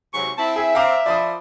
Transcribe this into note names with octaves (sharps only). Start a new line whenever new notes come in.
G#2 C3 F#3 C#6
C4 E4 A5
G#4 E5
C4 F5 A#5 D6
F3 D5 B5 D#6